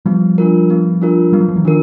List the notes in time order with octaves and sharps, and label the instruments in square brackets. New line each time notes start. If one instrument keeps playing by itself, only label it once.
[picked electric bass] F3 G3 [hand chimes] B3
[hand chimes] D4 F4 A#4
B3
D4 F4 A#4
[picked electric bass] G3 [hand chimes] B3
[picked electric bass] F#3
F3
E3 F#3
[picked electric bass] D#3 F3 [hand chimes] D4 F4 A#4